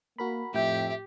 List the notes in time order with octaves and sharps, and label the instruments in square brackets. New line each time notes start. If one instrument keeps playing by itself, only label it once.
[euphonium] A#3 [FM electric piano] F#4 A#4 B5
[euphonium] F2 [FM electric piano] A2 G5 [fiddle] G4 [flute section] E5